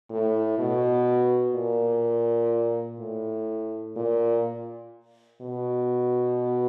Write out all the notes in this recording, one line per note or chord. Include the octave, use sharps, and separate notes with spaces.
A2
B2
A#2
A2
A#2
B2